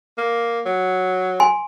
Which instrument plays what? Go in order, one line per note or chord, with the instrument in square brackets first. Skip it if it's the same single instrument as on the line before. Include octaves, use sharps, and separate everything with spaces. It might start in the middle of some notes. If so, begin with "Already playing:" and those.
[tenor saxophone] A#3
F#3
[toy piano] G#5 C6